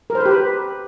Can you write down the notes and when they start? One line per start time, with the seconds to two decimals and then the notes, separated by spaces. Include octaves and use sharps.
0.10 A#4
0.15 C5
0.20 B4
0.26 G4
0.31 B4